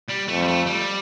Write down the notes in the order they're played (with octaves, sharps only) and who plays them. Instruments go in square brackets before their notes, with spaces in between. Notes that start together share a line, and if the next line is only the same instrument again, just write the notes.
[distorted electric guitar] G3
[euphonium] F2 [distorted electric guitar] A3
[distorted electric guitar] G3
A3
G3